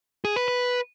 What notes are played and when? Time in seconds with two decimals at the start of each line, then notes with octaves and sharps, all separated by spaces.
0.25 G#4
0.36 B4
0.48 B4